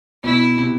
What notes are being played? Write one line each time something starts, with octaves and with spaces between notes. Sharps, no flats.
B2 E4
C3